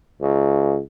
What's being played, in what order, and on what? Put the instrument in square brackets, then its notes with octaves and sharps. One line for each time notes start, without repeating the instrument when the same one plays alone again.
[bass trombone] C#2